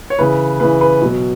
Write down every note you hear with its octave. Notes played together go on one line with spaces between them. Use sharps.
C#5
C#3 E3 B4
C#3 E3 B4
B4
B2 F#3